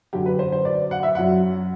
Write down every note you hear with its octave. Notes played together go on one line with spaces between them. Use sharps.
F#2 D3 F#3 G4
B4
C5
C5
D5
F#5
E5
F#2 F#3 F#5